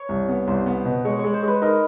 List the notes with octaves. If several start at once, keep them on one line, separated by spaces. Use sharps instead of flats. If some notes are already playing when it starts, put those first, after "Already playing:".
Already playing: C#5
C2
B3
C2 C5
B3
B2
G#3 C#5
G#3 C#5
C5
G#3 B4
D#4 A#4